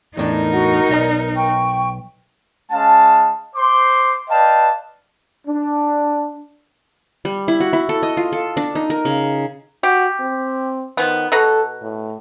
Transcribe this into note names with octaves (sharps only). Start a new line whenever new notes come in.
E2 A2 D4 D#4 A#4 D5
F#4 F#5
B1 D5 D#5 A#5
G5 C#6
G#3 C#4 F5 A5
C5 C6 D6
B4 D5 D#5 F5 G5 A5
D4
G3
E4
F#4
E4
A4
D#5
F4
A4
D4
D#4
A#4
C#3
F#4 G4
C4
D#3 F3 B3
B2 A4 B4 A#5
A2